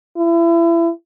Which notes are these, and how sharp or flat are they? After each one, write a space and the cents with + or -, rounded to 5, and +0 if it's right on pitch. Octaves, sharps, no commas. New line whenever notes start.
E4 +30